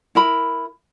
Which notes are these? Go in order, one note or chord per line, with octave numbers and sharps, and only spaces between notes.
E4 A#4 B5